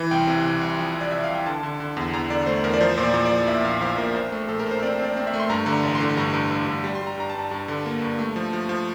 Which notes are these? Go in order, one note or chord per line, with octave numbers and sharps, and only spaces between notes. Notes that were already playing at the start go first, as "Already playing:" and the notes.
Already playing: E3
C2 G5
C3
C3
C2
F3
C2
D5
C2 E5
F5
C2
G5
D3 A5
D3
D3
E2
E2 A#5
D3 D5
A3 C5
E2 A#4
D5
F3 C5
A#2 C5
D5
A#2
D5
F3
A#1 E5
A#1 F5
F3 F5
A#2 A#4
A#1 C5
A3
A#1 A4
A#4
A#1 C5
C4 D5
C4 D5
C4
E5
A3
C6
G2 A#5
D3
A#5
A1
C6
D3
G2 A#5
G2
G2
G2
G3
C6
G3 A#5
G2 A#5
A5
G2
G2
D3
A#3
G2
A3
F3
F3
F3